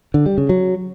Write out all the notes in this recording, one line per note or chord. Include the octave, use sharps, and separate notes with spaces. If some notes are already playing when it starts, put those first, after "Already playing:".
D3
G3
C#3
F#3